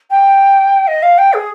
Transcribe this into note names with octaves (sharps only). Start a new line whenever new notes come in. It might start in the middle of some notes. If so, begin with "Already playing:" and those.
G5
D#5
F5
G5
G#4